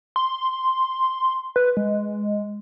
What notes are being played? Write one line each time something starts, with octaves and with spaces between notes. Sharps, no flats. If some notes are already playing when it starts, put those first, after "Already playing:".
C6
B4
G#3